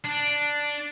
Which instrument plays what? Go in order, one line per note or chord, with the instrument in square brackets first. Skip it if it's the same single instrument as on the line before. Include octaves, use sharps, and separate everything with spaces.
[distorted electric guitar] D4